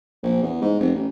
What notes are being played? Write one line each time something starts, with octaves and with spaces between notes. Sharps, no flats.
A#1
E2
G#2
F1
A1